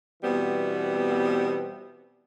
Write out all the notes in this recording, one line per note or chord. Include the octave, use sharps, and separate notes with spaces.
B2 E3 G3 B3 C4